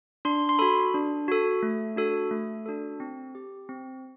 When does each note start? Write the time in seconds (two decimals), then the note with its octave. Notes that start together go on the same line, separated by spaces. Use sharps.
0.25 D4 C6
0.49 C6
0.59 F#4 A4 B5
0.94 D4
1.28 F#4 A4
1.63 A3
1.96 D4 F#4 A4
2.31 A3
2.66 D4 F#4 A4
3.00 C4
3.35 G4
3.69 C4